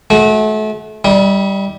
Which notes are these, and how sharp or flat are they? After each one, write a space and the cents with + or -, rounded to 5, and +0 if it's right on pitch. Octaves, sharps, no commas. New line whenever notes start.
A3 -35 F#4 +0
G3 +0 D#4 +40